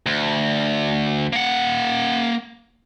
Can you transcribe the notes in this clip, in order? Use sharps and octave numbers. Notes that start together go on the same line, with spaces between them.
D2
A#3 F#5